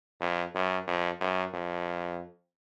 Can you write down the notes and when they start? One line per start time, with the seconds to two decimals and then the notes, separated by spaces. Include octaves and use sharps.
0.21 F2
0.55 F#2
0.87 F2
1.21 F#2
1.54 F2